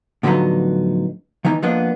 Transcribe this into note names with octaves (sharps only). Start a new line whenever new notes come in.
A2 D3 F3 F#3 B3 D#4
D#3 E3 B3 D#4
F3 A#3 B3 D4 D#5